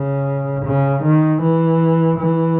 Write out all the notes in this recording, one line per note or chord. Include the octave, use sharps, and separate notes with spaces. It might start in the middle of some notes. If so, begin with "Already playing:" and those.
Already playing: C#3
C#3
D#3
E3
E3